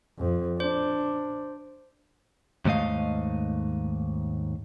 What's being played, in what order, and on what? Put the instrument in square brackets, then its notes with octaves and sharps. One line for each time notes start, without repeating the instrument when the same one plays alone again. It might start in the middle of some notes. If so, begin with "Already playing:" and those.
[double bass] F2
[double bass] D4 [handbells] C5
[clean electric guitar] D#2 G#2 A3 D#5 F5